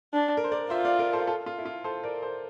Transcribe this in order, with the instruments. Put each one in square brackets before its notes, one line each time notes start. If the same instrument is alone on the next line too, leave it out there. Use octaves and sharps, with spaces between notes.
[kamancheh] D4
[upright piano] A#4
C5
A#4 D5
[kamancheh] F4 [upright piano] C5 E5
[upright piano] D5 F5
A#4 D5
A4 C5
F4 A4
F4
E4
F4
A4 C5
A#4 D5
A4 C5